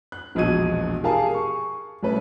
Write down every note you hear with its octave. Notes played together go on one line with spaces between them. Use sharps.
F#6
E1 A#1 B2 D#5 G#6 D#7
G4 G#4 A#4 F5 G#5 A5
C#6
C2 A3 C#4 B4